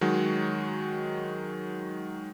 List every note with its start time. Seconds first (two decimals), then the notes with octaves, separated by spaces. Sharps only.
0.01 D#3 F#3 G#3 F#4